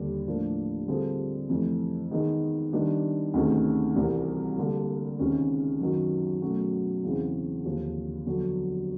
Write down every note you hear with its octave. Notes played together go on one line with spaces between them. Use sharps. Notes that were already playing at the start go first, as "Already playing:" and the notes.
Already playing: D#2 D3 G3
A2 F3 A#3 D4
D3 G3 C4 F4 G#4
F2 C3 E3 A3
D#3 G#3 B3 D#4
D#3 G3 B3 D4
D2 C3 D#3 G#3 C#4
C2 C3 E3 G3
D3 G3 A#3
C#2 C3 D#3 G#3 C#4
F#2 D#3 F#3 B3
B2 F#3 A3 C#4 F#4
E2 C#3 E3 G#3 C4
D#2 D3 F3
F2 D3 F#3 B3